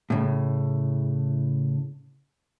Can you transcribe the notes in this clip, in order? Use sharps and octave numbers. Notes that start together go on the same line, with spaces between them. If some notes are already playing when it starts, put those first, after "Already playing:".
A2 C#3